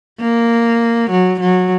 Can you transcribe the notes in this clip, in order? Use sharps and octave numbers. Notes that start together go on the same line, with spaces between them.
A#3
F#3
F#3